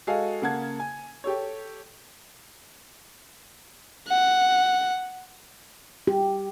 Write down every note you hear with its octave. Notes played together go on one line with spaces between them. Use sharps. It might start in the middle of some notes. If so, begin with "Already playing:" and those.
G#3 F#4 A4 F5 G#5
C#3 A#3 F#5 A5 G#6
G#5
G4 A4 C#5
F#5
G4